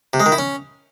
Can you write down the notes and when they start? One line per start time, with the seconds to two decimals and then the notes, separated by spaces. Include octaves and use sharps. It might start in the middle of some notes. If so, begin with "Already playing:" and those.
0.13 C3
0.20 G#3
0.26 D#3
0.32 E4
0.38 C#4